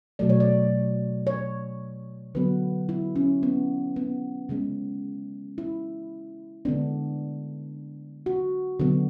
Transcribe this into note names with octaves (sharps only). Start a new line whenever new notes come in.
B2 F#3 A3 D5
C#5
D5
C#5
D3 F#3 B3 B4
E4
C#4
B3
B3
C#3 G#3 B3 C#4
E4
D3 G#3 B3 D4
F#4
D3 F#3 B3